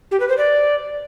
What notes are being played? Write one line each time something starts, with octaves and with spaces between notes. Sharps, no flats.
G4
B4
C5
D5